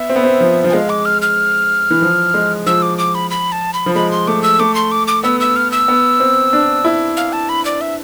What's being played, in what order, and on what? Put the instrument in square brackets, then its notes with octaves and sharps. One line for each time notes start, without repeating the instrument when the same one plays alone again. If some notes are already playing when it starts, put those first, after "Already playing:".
Already playing: [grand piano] B3 [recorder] E5
[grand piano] C4
B3
C4
F3
F3
[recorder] G#5
[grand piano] G#3 [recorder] F5
[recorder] D6
F6
F6
[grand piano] E3
F3
G#3
[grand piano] F3 [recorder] E6
[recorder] D6
D6
B5
B5
A5
B5
[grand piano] F3
[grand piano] G#3 [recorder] B5
[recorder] C6
[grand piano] A3 [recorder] D6
[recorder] E6
[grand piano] A3 [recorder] D6
[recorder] C6
D6
D6
[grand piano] B3 [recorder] E6
[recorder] E6
F6
E6
[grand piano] B3
C4
D4
E4
[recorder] F5
A5
B5
D5
E5